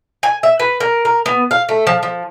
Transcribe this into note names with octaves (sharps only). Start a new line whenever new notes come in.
G#5
E5
B4
A#4
A#4
B3
F5
A3
F3
F3